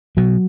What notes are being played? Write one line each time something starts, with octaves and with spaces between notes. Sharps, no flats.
B2 F#3